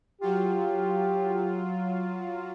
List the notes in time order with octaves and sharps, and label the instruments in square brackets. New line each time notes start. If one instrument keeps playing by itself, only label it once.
[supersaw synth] F#3 F4 [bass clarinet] G4